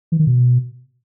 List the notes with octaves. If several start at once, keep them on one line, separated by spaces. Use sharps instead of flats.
E3
D#3
B2